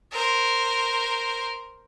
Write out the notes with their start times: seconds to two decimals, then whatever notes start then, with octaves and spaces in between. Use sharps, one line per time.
0.12 A#4 C5